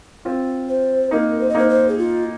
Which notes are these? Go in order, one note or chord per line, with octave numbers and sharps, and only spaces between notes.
C4 F4
C5
A#3 D#4 A#4
C5
D#5
A#3 D#4 C5
C5
G#4
F4